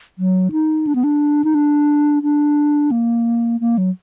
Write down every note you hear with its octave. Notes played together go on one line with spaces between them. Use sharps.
F#3
D#4
D4
B3
D4
D#4
D4
D4
A#3
A#3
F#3